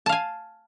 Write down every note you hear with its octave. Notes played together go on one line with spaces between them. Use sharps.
F5 G#5 A5